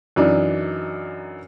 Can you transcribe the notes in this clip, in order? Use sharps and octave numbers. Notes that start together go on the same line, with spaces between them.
F#2 E3 D4 D#4